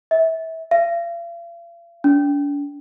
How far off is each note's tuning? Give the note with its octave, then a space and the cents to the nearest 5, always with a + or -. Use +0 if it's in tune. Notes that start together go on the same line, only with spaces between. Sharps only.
E5 -25
F5 -40
D4 -40